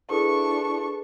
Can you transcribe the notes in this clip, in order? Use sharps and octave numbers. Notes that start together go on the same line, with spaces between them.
D4 E4 G#4 A4 B4 C#6